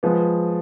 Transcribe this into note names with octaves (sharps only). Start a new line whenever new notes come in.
F3 G#3 B3